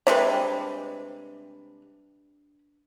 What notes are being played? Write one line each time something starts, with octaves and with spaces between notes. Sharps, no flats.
C3 G3 G#3 D4 B4 C5